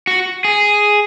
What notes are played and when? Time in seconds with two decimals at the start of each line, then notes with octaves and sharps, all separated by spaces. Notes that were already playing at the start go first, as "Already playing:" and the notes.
0.07 F#4
0.44 G#4